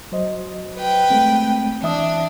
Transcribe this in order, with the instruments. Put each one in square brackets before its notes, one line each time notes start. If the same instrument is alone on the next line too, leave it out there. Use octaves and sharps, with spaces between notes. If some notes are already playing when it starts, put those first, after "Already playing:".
[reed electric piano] F#3 C5 D#5
[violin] B4 G5
[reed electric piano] G#3 A3 C4
[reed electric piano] E3 E5 D#6 [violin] D4